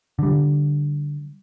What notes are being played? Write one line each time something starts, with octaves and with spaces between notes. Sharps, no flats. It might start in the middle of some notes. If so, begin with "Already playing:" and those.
D3 G3